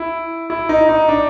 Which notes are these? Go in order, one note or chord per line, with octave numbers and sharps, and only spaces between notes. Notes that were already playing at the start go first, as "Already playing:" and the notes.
Already playing: E4
E4
D#4
D#4
D4